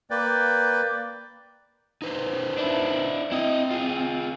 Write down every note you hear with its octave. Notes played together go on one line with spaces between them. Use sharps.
A#3 B4 D5 G5
D#4 B4 C5
D4 E4
C4 E4 D#5
F4 G#4